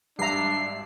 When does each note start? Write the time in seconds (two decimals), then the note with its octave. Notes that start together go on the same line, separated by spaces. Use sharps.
0.19 G#1 G3 D4 E5 A#5 C7